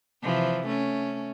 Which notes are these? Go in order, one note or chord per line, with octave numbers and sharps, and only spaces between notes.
C3 E3 F3
A3 C#4